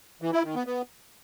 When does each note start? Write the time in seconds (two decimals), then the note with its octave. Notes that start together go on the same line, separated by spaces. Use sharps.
0.22 E3
0.33 E4
0.44 D#3
0.55 B3
0.66 B3